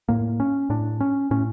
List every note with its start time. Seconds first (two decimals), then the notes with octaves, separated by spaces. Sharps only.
0.09 A2 A#3
0.40 C#4
0.70 A2 D4
1.01 C#4
1.31 A2 C#4